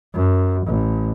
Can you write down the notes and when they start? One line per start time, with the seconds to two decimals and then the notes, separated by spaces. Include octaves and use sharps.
0.15 F#2
0.67 A1